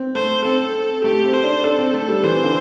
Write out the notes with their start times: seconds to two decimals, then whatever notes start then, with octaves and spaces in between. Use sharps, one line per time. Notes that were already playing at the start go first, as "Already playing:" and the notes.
Already playing: C4
0.15 A3 C5
0.45 C4 A4
1.04 A3 G4
1.24 C4
1.34 C5
1.44 D4
1.64 D4 A4
1.79 C4
1.94 A3
2.09 G3
2.24 E3 C5
2.44 D3